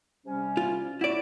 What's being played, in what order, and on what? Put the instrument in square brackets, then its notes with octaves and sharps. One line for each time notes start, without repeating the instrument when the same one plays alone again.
[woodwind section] C3 G3 C#4
[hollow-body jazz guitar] F4
[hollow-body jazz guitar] E4 D5 [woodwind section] F#4